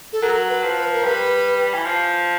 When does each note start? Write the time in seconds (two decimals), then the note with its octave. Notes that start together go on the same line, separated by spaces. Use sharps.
0.13 A4
0.22 F#3 A#4
0.49 B4
0.63 F3
0.77 B4
0.93 A#4
1.04 G3 B4
1.74 E3
1.86 F3